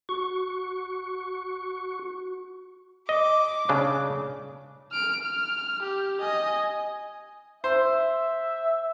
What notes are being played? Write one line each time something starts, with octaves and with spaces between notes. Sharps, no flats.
F#4 C#6
D#5 D6
C#3 D4
F6 D7
F6
G4
D#5 G#5
C5 E5